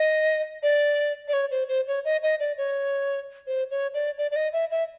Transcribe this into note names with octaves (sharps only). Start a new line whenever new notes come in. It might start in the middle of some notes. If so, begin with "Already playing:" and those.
Already playing: D#5
D5
D5
C#5
C5
C5
C#5
D#5
D#5
D5
C#5
C5
C#5
D5
D5
D5
D#5
E5
E5